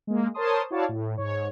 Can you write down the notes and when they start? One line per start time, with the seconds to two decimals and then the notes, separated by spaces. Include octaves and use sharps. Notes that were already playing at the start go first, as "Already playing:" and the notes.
0.07 G#3 A#3
0.34 A#4 C5 C#5 A5 C6 D#6
0.70 E4 F#4 C#5 D5 F5 A5
0.89 A2
1.17 G#2 C#5